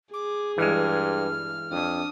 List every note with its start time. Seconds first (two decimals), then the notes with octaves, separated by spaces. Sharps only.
0.13 G#4 D6
0.58 G2 E3 G#3 F6
1.71 F2 D4 D#6